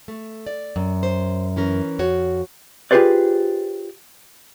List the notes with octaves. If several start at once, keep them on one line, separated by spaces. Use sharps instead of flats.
A3
D5
F#2
C5
E3 C#4 A#4
F2 F#4 C#5
F4 G4 G#4 B4 C5 D5